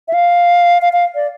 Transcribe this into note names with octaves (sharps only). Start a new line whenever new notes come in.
E5
F5
F5
F5
D5